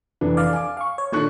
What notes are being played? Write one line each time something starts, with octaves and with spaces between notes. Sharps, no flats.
F1 E3 D4
D5 F5
G#5 D6
F5 C#6
C#5
A#2 D#3 D4 A4 C#6 F#6